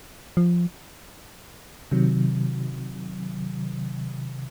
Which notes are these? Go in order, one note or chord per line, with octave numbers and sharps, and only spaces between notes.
F3
C3 D#3 F#3